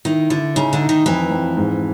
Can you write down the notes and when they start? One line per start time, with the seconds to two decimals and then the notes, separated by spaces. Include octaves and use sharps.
0.05 D#3 E4
0.30 D3 E4
0.56 C#3 D#4
0.73 D3
0.81 D#4
0.89 D#3
1.06 F2 E3
1.31 F2
1.57 G#2